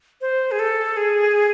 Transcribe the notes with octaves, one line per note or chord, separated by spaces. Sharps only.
C5
G#4
A4
G#4